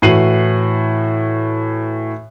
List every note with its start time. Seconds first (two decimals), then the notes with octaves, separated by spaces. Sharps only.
0.02 A2 E3 F#4 C7 D#7 F#7